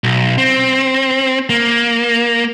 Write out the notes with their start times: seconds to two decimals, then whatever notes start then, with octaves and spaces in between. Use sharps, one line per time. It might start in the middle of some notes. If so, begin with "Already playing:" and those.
0.04 B1
0.38 C4
1.50 A#3